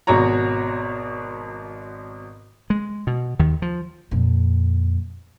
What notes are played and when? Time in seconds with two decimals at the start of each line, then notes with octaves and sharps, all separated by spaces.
0.07 G#1 B2 F#4 C#5 A#5
2.70 G#3
3.07 B2
3.39 D#2 D#3
3.62 F3
4.11 F2 A#2